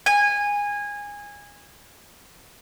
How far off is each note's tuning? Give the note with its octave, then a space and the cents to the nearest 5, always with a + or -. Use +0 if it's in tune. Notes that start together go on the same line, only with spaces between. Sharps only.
G#5 -20